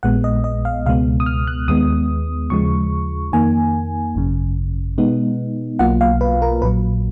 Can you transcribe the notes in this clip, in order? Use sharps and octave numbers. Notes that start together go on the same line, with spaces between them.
A#1 A#2 G#3 B3 F#5
D#5
D#5
F5
C#2 B2 G#3 B3 F5
D#6
F6
F#6
D#2 D#3 G#3 B3 D#6
D#2 C#3 F3 G#3 C#6
F2 D#3 A#3 G#5
G#1 F#2 C#3
B2 G#3 B3 D#4
B1 B2 F#3 A#3 F4 F#5
F5
B4
A#4
A#1 A#2 F#3 B4